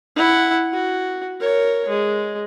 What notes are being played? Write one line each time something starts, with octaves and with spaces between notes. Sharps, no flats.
E4 F#5
F#4
A#4 C#5
G#3